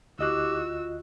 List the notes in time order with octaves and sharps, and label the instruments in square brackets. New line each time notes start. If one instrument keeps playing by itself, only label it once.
[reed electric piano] D2 D#5 F#6 [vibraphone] E4 G4 D6 [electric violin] F#4 E6
[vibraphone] F4